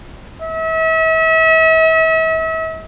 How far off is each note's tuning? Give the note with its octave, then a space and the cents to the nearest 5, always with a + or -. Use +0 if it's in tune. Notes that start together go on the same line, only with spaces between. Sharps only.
E5 -40